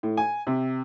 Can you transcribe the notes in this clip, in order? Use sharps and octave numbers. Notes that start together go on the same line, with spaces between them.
A2
G#5
C3